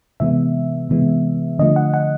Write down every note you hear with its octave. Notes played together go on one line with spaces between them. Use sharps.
C3 E3 G#3 B3 E5
C3 E3 G#3 B3
D3 F3 A3 D#5
F#5
F#5